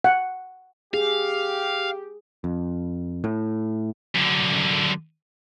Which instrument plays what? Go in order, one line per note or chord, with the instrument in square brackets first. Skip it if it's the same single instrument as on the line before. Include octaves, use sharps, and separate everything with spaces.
[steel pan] F#5
[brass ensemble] G4 [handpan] G#4 [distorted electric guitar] F5
[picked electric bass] F2
A2
[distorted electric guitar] F#2 D3